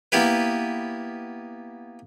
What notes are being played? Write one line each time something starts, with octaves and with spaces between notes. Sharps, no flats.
A#3 B3 E4 G4 B4